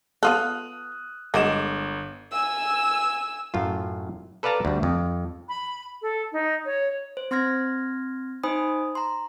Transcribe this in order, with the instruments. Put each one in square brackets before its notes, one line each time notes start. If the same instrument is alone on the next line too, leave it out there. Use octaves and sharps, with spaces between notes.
[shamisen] B3 F4 A4 [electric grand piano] D#6 F6 F#6
[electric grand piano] G1 D6 E7 [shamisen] G#3 F#4 A#4
[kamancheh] G#5 E6
[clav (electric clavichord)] F#2 A2 F4
A4 B4 D5 F5 A5 A#5
D2 G3
F2
[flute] B5
A4
D#4
C#5
[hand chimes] C5
C4 C6 F6 G#6 A#6
D#4 C5 G#5 B5 D#6
A#5 C6